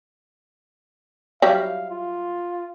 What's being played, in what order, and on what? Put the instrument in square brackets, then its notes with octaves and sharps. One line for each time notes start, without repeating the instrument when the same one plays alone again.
[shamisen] F#3 G3 E4 [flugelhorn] F5
[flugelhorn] F4